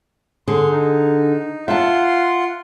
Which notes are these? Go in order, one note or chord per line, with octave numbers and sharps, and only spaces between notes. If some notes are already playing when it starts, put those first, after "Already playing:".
D3 G#4 C6
D#4
F4 E5 F#5 A5 C6